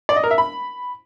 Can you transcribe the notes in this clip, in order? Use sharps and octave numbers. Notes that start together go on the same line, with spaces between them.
D5
D#5
A#4
E5
B5